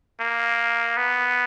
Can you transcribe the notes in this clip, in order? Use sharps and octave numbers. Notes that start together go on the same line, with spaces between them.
A#3
B3